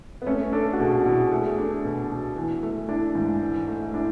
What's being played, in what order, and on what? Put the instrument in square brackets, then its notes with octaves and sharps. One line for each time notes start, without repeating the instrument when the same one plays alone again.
[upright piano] B3
[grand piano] A3 [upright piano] C#4
[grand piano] D4 [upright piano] A4
[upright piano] F#4
[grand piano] B2 [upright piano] G#4
[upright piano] F#4
[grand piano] B2 [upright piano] E4
[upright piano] G#4
[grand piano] A3 [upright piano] G#4
[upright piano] G#4
[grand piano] D4 [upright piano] A4
[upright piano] G#4
[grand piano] B2
B2
E3
A3
[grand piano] D4 [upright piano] E4
[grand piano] G#2
E3
A3
[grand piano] D4 [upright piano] E4